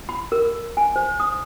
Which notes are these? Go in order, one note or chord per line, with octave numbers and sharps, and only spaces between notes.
B5
A#4
G#5
C5
D#6